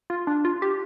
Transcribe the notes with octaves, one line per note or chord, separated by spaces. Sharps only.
F4
D4
F4
G4